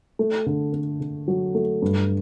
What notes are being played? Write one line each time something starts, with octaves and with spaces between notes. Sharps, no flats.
A3
D3
D3
D3
F#3
A3
G2